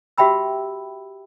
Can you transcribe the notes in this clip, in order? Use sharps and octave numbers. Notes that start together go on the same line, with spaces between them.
F#4 G4 E5 G5 B5 E6